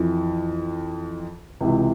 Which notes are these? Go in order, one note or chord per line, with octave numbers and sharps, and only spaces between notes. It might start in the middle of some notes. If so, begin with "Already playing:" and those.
Already playing: F2 E3
C#2 C3 E3